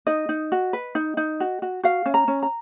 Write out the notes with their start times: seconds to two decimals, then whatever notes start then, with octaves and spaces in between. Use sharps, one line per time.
0.07 D#4 D#5
0.29 D#4
0.52 F#4
0.73 B4
0.95 D#4
1.17 D#4
1.40 F#4
1.62 F#4
1.83 F#4 F5
2.06 C#4
2.14 A#5
2.28 C#4
2.42 A#5